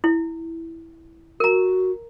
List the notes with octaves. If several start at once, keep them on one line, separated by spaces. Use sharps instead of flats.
E4
F#4 A#4 A#5